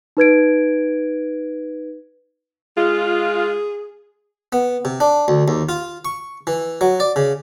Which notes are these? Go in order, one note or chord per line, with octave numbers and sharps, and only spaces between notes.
D#4 B4 G#6 D7
G#3 F4 G#4
B3
C3
D4
D2
D#2
F4
C#6
E3
F#3
D5
C#3